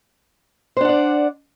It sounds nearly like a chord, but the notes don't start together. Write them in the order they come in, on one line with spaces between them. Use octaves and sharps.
C5 D4 F#5 D5